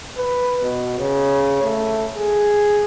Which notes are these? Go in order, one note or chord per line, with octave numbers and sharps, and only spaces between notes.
B4
B2
C#3
A3
G#4